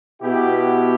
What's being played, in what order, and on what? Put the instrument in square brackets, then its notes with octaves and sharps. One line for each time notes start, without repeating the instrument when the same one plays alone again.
[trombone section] B2 B3 E4 G4